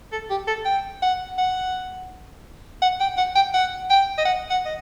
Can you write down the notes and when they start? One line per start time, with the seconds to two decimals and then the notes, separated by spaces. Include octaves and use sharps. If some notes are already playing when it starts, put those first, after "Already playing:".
0.12 A4
0.30 G4
0.47 A4
0.65 G5
1.02 F#5
1.38 F#5
2.82 F#5
3.00 G5
3.17 F#5
3.35 G5
3.54 F#5
3.90 G5
4.18 D#5
4.25 F#5
4.50 F#5
4.65 D#5